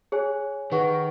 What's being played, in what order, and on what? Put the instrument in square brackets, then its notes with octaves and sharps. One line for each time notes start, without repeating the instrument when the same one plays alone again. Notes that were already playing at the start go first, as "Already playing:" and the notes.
[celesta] G#4 C#5 G#5
[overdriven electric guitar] D#3 [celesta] G#4 B4 F#5 C#6